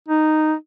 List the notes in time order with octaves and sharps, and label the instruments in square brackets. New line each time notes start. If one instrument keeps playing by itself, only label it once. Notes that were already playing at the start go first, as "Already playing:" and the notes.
[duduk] D#4